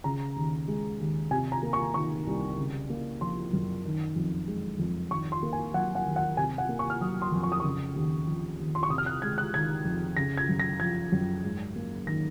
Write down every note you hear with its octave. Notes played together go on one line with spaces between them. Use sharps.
C#3 A#5
D#2
G#3
D#2
C3 G#5
A#5
A#3
C#6
D#3 C#6
C2
C#3
A#3
F3 C6
F#2
D#3
F2
G#3
F2
D#3 C#6
C6
A#3
G#5
F#3 F#5
F#5
D#2
F#5
C3 G#5
F#5
A#3
C#6
F6
F#3 D#6
C6
F2
C#6
D#6
C#3 C#6
D#2
F3
D#2
C6
C#6
C3 D#6
F6
F#6
G#3 G#6
F#6
D#3 G#6
F2
C#3 A#6
G#6
F#2
A#6
F3 G#6
F#2
G#2
A#3
D#3 A#6